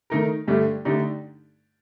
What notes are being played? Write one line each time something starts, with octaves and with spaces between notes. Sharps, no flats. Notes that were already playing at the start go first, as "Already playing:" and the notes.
D#3 A3 D#4 A#4
G2 D3 A3 D4 G4
D3 A3 D#4 G4 D5